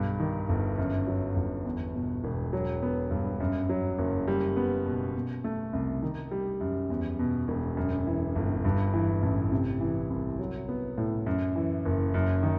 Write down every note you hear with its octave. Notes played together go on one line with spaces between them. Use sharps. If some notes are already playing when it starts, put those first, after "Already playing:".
Already playing: B1 G2
D#3
G1
F#2
F#3
G1
E2
B2
E1
F#3
B3
G2
F#2
F#3
F#1
G3
B3
B2
B2
A3
C2
D#3
G3
F#2
E2
B2
E1
F#2
E3
G1
G2
E3
A1
C3
E3
C2
F#3
B3
A2
F#2
E3
F#1
F#2
D#3